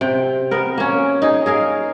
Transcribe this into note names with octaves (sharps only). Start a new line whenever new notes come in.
C3 G5
B3 A#4
A#3 C#4
D#4 G#4
G#4 A#4 F5